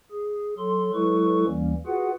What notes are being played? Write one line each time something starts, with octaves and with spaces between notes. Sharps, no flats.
G#4
F#3 A4 C6
F#3 G#3 E4 A4 B4 C#6
D#2 E3 G3 A#3 C#4
F4 F#4 G#4 B4 F#5